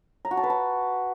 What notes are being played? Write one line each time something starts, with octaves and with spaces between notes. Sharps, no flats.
A#5
F#4
A5
B4
A5